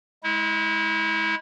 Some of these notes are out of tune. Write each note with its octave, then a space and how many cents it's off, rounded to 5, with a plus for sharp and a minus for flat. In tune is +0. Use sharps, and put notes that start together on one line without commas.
G#3 +15 E4 -25